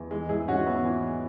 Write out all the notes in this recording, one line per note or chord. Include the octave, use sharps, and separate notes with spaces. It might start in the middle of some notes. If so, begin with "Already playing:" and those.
Already playing: E2
E3 G#3
G#2 E4 G#4
G#2 C#4 F#4
E3 B3 E4
E3